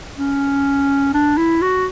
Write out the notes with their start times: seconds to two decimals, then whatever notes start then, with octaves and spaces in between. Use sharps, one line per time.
0.18 C#4
1.14 D4
1.38 E4
1.62 F#4